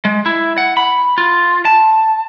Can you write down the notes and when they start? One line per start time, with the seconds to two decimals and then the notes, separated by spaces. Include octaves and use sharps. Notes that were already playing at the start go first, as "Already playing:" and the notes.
0.05 G#3
0.26 E4
0.58 F#5
0.77 B5
1.18 F4
1.65 A5